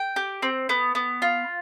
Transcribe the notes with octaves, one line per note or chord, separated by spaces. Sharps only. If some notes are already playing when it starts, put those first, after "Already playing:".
Already playing: G5
G4
C4
B3
B3
F4